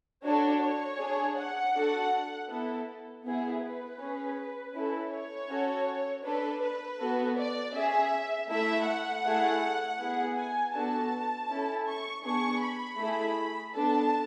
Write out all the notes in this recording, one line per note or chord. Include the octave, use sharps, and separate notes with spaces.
D4 F#4 A4 C#5
C#5
D4 G#4
F#5
D4 F#4 A4
B3 E4 A4
B3 E4 G#4
B4
C#4 G#4
C#4 E4 A4
C#5
C#4 F#4 A4
D4 A4 B4
B4
B3 F#4 A4
D5
C#4 G#4 E5
A3 E4 A4 E5
F#5
A3 E4 G#4
B3 E4 G#4
G#5
B3 D4 F#4 A4 A5
C#4 E4 A4
C#6
B3 D4 G#4 C#6
B5
A3 E4 G#4
B3 D4 A4 A5